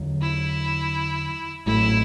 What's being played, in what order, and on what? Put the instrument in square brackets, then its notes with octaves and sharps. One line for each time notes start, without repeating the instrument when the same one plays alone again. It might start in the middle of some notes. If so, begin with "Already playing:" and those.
Already playing: [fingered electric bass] E2 D3 F#3
[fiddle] E4
[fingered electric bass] A1 A2 F#3 A3 [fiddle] E4